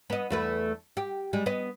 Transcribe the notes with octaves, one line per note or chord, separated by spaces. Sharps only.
B3 D#5
E2 A3 B4
G4
G3 G#3
B3 D#5